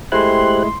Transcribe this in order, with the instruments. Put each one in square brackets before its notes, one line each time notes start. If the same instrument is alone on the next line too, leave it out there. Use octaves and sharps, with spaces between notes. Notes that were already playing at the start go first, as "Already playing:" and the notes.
[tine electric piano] G#3 A3 E4 [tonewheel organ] G4 C5 F#6 [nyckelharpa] C6